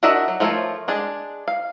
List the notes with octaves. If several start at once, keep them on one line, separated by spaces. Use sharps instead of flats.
D4 F#4 A#4 D#5 E5
F#3
F3 A3 F4 A#4 C#5
G#3 D4 G#4
F5